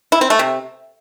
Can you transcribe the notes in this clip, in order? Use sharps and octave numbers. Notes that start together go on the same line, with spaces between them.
E4
C4
A3
C3